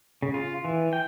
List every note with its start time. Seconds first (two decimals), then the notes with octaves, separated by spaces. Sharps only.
0.22 C#3
0.34 F4
0.65 E3
0.93 G5